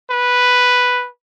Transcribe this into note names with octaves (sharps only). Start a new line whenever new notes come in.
B4